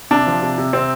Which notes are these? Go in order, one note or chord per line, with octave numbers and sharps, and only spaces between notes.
C3 D4
F3
C3
C3
C3 C4